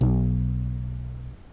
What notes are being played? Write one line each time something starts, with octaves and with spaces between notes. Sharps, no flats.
B1